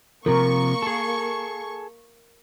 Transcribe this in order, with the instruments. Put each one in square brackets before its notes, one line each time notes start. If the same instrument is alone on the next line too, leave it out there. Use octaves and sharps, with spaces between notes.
[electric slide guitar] C3 F3 [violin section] A#3 C#6 [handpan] A#4
[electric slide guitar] G#4 A4